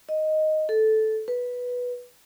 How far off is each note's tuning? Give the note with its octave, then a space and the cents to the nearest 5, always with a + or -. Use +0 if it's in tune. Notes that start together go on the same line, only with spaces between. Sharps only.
D#5 +0
A4 -10
B4 -5